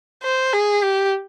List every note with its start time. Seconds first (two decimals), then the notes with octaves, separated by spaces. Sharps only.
0.23 C5
0.53 G#4
0.83 G4